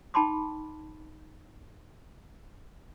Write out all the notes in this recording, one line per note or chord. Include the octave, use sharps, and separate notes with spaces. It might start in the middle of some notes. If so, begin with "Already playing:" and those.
D#4 G5 A5 B5 C6 D6